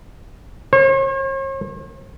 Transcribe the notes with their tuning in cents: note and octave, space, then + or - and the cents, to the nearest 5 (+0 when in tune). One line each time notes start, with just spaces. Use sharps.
C#5 -45